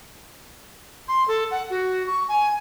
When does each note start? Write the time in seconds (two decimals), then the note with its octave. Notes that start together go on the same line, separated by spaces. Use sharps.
1.08 C6
1.28 A4
1.51 F#5
1.70 F#4
2.07 C#6
2.29 G#5